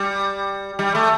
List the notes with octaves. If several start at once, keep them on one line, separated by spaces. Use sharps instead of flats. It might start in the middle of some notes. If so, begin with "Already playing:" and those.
Already playing: G3
G3
A3